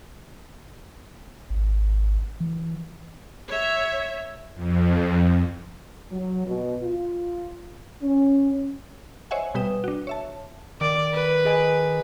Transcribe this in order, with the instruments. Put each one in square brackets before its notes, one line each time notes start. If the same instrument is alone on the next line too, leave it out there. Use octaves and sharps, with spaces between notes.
[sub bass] G#1
E3
[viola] C#5 E5
[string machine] F2
[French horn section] F#3
B2
F4
C#4
[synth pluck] C5 C#5 D#5 E5 F#5 G#5
B2 G3 B4 G5 D#6 E7
D4 F#4
C#5 E5 A5
[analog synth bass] D#3 [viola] D5
[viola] B4
[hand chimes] G#4 D#5 G#5